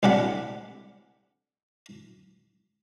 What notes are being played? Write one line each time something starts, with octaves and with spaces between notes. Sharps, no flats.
C2 A2 G3 D4 F#5 B5